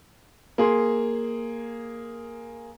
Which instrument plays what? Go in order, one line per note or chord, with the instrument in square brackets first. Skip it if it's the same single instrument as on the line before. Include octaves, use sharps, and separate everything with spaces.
[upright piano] A#3 G#4 C6